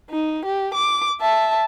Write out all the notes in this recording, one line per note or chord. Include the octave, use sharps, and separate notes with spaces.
D#4
G4
D6
E5 A5